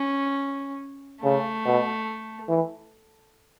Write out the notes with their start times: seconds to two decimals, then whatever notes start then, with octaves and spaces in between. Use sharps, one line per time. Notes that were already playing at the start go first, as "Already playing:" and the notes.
Already playing: C#4
1.23 C#3 A3
1.65 B2
2.48 E3